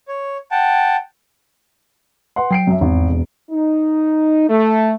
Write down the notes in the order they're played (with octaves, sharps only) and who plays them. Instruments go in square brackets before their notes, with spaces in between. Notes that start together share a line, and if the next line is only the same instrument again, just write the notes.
[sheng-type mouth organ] C#5
F#5 G5 A5
[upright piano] B4 F#5 C6
[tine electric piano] F#3 [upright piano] G5 C7 D7
[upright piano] F#2 E5
[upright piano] G#1 [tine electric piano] E2
[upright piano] E1
[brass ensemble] D#4
A3